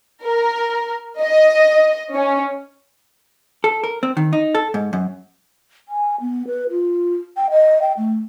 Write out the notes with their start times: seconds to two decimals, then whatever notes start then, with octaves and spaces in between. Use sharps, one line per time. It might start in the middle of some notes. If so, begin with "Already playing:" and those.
0.24 A#4
1.21 D#5
2.14 C#4
3.64 A4
3.84 A#4
4.03 C4
4.17 D#3
4.33 D#4
4.55 A4
4.74 G#2
4.93 F#2
5.88 G#5
6.20 B3
6.47 B4
6.70 F4
7.36 G5
7.51 D#5
7.82 G5
7.97 A3